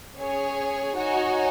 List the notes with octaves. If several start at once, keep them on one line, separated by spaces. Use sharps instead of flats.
C#4 G#4 C#5 G#5
D#4 F#4 C#5 G#5